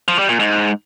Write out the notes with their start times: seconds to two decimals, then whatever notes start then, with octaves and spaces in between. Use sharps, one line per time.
0.08 F3
0.19 G3
0.29 A#2
0.39 G#2